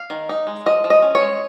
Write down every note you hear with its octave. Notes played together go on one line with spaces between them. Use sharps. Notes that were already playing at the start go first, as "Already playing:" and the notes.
Already playing: F5
D#3
D#4
G#3
F3 D#5
F3
D#5
C#4
C#5
G#3